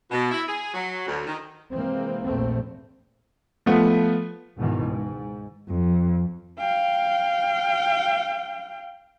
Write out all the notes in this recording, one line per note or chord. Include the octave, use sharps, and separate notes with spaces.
B2
E4
G#4
F#3
D2
D#3
C3 E3 G#3 A#3 C4
A#1 E2 A3 C4
F3 A3 B3
C#2 G#2 B2 D#3 E3
G#2
F2
F5 G5